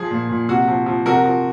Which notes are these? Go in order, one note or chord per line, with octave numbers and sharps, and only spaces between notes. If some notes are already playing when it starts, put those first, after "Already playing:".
Already playing: F3 G#4
A#2
A#2
C3 F#4
F3
F3
C3 F#4 A#4
F3